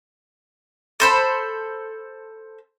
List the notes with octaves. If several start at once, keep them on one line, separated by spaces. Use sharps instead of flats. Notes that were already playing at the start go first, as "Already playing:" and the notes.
A4 C5 B5